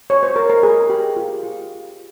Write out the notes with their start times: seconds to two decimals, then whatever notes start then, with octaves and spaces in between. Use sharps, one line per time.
0.10 C#5
0.23 C5
0.36 A#4
0.50 A#4
0.63 G#4
0.90 G4
1.17 F4
1.43 F4